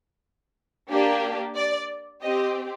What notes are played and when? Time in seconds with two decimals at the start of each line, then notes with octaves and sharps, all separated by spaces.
0.90 A#3 D4 G4
1.56 D5
2.22 C4 G4 D#5